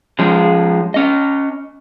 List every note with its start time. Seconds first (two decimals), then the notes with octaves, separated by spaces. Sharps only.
0.19 F3 G#3 C#4
0.94 C#4 D#5